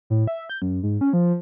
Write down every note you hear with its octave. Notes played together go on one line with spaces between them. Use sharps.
A2
E5
G6
F#2
G#2
C#4
F3